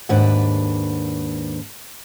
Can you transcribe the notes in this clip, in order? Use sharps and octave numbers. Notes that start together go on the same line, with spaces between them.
D#2 G#2 D4 B4 F#5